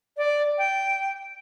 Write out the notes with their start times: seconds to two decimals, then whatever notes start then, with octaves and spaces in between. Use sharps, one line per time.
0.17 D5
0.58 G5